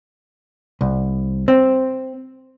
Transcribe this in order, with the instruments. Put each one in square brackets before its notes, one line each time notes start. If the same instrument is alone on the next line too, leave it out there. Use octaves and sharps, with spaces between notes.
[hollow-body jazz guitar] C2
C4